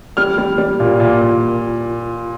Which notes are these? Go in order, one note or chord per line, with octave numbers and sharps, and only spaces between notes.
G3 F6
G3
G3
A#2
A#2
A#2